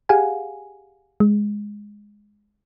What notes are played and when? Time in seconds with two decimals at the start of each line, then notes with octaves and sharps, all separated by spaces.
0.09 G4 G#4 F5 F#5 G#5
1.20 G#3